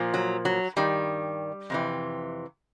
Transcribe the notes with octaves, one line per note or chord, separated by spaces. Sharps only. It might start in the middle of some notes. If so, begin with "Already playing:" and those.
Already playing: A#2 F3
F#3
F#3
G2 D#3 G3
F2 C3 E3